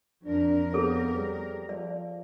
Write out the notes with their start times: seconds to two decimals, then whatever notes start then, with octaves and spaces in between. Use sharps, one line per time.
0.25 F2 D4 A#4
0.73 B3 G#4 A4 C#5
1.15 G3
1.69 F3 D5